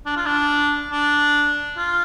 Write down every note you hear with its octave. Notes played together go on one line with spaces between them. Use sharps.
D4
F4
D4
D4
F4